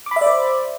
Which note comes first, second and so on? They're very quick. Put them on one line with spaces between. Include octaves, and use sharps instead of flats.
D6 B5 E5 D5 C5